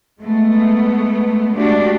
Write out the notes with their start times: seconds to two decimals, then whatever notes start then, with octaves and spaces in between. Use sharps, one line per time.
0.20 G#3 A3 B3
1.53 G#3 A3 D4 F#4 G4